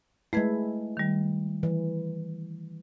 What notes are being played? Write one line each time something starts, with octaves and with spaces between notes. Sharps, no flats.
G#3 A3 E4 B4 G#6
D#3 G3
E3